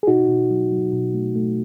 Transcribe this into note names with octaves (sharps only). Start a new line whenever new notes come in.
G#4
B2 D#4 F#4
B2
F#3
F#3
B2
A3
A3